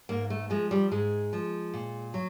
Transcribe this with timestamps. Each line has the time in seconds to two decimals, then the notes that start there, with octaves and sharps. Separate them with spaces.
0.09 G#2 A#3
0.30 A3
0.50 F3 G#3
0.71 G3
0.91 G#2 G#3
1.33 F3
1.74 A#2
2.14 F#3